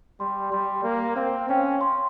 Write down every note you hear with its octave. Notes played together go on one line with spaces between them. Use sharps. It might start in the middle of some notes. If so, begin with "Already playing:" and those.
G3 C6
G3 C6
A#3
C4 F5
C#4 G5
C6